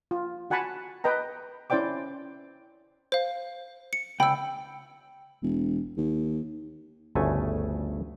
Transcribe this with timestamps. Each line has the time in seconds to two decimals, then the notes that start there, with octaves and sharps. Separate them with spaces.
0.11 F4
0.50 F#4 F#5 G#5 A5 B5
1.04 B4 D#5 G5 A#5
1.70 C#4 E4 C5 D5 G5 D6
3.12 C5 F5
3.93 C#7
4.20 C#2 G5 B5 E6
5.43 E1
5.97 D#2
7.15 G1 D2 C#3 A3 G#5